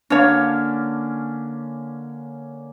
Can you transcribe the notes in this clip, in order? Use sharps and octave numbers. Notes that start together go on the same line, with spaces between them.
D3 A#3 C#4 D4 C#5